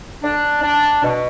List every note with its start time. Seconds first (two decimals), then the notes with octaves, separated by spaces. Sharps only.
0.23 D4
0.63 D4
1.03 B2